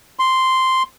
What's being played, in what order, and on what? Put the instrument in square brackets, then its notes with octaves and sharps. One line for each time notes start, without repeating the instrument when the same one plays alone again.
[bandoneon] C6